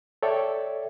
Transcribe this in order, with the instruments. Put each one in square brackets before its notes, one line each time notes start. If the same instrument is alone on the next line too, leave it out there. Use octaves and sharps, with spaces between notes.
[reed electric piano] A4 C#5 D5 E5 G5